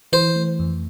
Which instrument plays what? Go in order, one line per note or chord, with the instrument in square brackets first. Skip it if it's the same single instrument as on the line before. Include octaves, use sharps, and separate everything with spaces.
[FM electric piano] E3 [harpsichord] C5
[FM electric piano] A3
F2